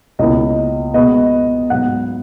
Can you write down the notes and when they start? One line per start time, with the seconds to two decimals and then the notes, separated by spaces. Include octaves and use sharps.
0.19 C#2 B2 A#3 E4 D#5
0.94 B2 G#3 B3 D#5
1.70 G#2 F#3 B3 F#5